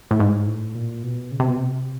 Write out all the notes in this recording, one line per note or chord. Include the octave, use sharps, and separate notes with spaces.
A2
G#2
A2
A#2
B2
C#3
C3
B2
C3